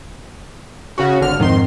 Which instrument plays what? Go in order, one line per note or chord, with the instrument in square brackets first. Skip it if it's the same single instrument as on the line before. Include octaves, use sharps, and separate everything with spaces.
[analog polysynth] C#3 C#4 F#4
G#1 D3 F6
[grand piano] F2 G#2 [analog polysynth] D#3 C6